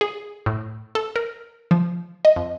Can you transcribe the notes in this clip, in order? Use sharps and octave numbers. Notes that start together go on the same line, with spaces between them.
G#4
A2
A4
A#4
F3
D#5
F2